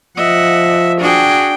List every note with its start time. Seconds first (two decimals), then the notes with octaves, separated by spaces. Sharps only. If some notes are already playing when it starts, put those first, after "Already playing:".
0.17 F3 D#5 E5 F#5
1.00 D4 F#4 G#4 G5